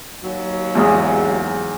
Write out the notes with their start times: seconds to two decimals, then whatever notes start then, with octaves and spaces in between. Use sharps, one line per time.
0.22 D#2 F#3
0.75 E2 G#2 D#6